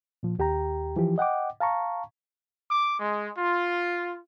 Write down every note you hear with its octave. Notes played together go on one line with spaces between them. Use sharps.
A#2 F3
D#2 G4 G5 A#5
E3 F3 G4
D#5 F#5 G5 D6
F5 A5 A#5 C#6
D6
G#3
F4